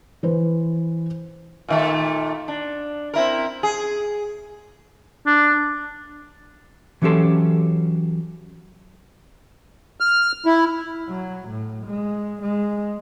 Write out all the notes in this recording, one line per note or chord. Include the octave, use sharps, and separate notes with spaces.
E3 B4 C5
A#2 D#3 A3
D4
C4 E4 A#4
G#4
D4
E3 F#3 C#4 G4 A4 C6
F6
E4
F#3
A2
G#3
G#3